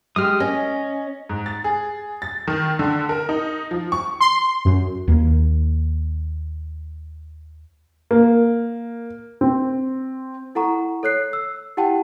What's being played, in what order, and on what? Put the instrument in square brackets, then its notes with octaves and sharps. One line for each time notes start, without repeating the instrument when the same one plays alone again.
[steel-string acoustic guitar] G#3 G4 [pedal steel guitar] D#6 F6
[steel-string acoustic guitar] C#4 [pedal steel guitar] D#5
[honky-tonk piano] G#2
A6
G#4
A6
D#3
D3
A#4
D#4
F3
C#6
[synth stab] C6
F#2
[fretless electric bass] D#2 A#3
[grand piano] A#3
C4
[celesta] E4 A4 F#5 A#5 C#6
A4 C#5 F#6 C7
E6
E4 G4 F#5 G5 A5